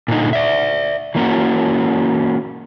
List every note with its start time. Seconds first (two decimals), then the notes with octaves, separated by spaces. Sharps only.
0.08 A#2 D3 D#4
0.33 D5 E5
1.15 E3 A#3 C#4 F#4